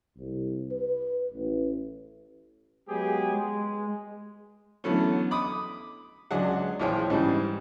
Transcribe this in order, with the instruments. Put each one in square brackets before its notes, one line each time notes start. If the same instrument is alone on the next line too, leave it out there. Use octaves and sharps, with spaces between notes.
[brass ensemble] C2
B4
A1
[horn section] F#3 G#3 B3 G4 G#4
G#3
[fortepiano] D3 E3 F#3 A3 B3 C#4
B5 D6 D#6
C#2 F#3 D4 G#4 F#5
A#1 E3 F3 G#4 C#5 G5
G#2 C#3 E3 G3